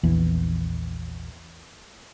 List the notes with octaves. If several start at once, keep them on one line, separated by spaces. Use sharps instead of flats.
A#1 E2 E3